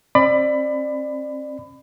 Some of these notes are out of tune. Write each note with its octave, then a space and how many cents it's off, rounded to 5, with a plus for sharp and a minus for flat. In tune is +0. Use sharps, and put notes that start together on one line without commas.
C4 +40 D5 +30 B5 +25